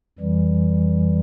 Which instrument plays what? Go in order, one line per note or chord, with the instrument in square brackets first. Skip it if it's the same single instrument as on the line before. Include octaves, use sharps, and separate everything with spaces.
[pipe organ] F2 E3 G3